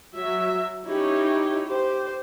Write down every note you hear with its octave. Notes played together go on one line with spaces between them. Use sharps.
F#3 E5
C#4 D#4 E4 G4 C#5
G4 C5